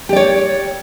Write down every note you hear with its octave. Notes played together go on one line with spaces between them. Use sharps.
G4 C#5 D5